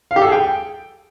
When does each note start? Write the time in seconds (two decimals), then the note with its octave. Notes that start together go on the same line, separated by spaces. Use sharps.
0.11 F5
0.16 G4
0.21 A4
0.27 G#4
0.32 G5